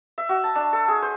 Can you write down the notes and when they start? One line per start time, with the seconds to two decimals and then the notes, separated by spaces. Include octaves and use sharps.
0.18 E5
0.29 F#4
0.44 A5
0.56 D4
0.73 A4
0.88 G#4
1.02 C5